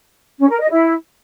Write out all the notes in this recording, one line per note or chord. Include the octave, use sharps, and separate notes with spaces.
C#4
A#4
D#5
E4